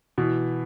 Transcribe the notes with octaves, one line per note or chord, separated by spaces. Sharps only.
B2 E3